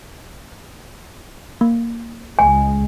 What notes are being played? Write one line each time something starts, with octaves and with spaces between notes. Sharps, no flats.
A#3
C#2 G#3 G#5